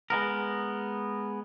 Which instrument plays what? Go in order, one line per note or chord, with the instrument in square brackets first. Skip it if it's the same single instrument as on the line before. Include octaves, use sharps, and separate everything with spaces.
[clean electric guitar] G#3 B3 A#4